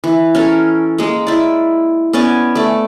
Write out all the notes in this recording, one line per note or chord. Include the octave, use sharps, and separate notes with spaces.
E3
C#4 A4 A#4
G#3 A#3
E4 D5
B3 C#4 D5 G#5
A3 D5